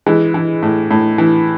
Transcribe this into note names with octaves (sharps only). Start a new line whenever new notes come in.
E3 G#3
E3
A2
A2
E3